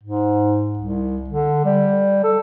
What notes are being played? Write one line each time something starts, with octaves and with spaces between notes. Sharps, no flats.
G#2
C2
D3
G3
A4